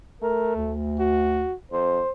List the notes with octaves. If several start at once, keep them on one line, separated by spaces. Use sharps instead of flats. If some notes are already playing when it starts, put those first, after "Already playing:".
A3 A#4
D2
F#4
F2 C5